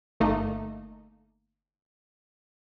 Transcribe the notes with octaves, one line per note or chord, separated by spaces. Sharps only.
G1 A3 A#3 D#4